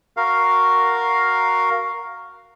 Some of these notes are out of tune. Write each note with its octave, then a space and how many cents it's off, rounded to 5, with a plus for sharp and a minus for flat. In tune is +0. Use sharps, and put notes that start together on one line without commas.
F#4 +0 A#4 +0 F5 +0